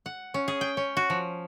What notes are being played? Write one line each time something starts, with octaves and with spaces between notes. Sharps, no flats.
F#5
C#4
G#4
G5
C#4
F#4
F3